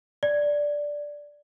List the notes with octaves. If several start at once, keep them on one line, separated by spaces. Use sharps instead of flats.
D5